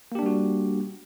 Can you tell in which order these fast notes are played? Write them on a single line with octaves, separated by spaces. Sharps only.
A#3 G4 D4 G3 F#4